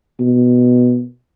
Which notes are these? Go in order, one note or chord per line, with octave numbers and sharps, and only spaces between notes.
B2